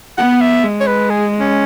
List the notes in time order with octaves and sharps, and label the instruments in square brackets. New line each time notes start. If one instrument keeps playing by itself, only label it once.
[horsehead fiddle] B3 [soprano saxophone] F#5
[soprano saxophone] E5
[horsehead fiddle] G#3
[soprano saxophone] C#5
B4
G#4
C#4